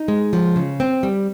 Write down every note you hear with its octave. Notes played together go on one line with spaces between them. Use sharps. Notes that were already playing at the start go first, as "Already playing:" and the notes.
Already playing: D#4
G#3
F3
C#3
C4
G3